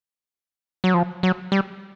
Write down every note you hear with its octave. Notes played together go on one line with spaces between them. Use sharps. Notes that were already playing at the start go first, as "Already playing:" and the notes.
F#3
F3
F#3
G3